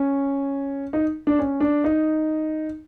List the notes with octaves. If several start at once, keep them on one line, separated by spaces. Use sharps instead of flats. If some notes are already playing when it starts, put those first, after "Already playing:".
Already playing: C#4
D#4
D4
C#4
D4
D#4